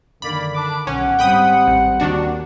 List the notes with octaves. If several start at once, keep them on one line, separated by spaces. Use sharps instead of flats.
F#2 D3 D#3 A#3 D5 B5
D4 A5 D6
B1 C#4 F#5
G#1 G3 C4 G5 B5 D#6
A1
D#2 D#3 D4 F#4